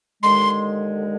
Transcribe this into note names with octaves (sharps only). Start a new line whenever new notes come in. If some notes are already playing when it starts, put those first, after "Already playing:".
D#2 D3 G#3 C6